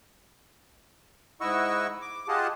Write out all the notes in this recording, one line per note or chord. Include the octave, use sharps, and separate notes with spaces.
G#2 E4 D#5 F#5 C#6 E6
D6
F4 G4 G#4 D#5 F#5 A5